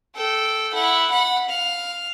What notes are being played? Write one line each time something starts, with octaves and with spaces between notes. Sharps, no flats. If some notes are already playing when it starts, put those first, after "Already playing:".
A4 G5
E4 F#5
F#5 B5
F5